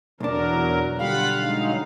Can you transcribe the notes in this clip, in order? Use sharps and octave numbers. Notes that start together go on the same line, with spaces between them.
B1 E2 F#3 D4 A#4
D3 G3 F4 F5 F#5 B5
F#3 G#3 D#4